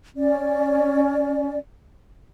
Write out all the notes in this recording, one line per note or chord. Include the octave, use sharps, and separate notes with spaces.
C#4 D5